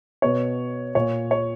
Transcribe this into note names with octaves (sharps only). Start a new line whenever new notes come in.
B2 C#5
A#2 C#5
C#5